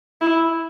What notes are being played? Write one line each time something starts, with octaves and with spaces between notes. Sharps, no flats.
E4